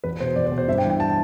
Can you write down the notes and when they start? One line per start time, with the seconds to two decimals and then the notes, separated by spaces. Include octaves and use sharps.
0.04 E2 B4
0.20 B2 C5
0.36 E2 D5
0.46 C5
0.52 B2
0.58 C5
0.68 G2 E5
0.78 G5
0.85 E3
0.90 G5
1.00 A5